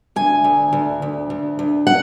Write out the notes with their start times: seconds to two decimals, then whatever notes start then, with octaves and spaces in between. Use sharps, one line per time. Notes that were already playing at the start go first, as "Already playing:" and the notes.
0.16 D2 G#5
0.44 D2
0.73 D2
1.02 D2
1.30 D2
1.59 D2
1.87 F#5